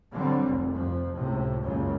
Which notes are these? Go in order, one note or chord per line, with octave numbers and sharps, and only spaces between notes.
D3 F#3 G3 C4
F1 C2
F2 F3
C#2 A2 C3
F#1 C#2 F#2 A#2 C#3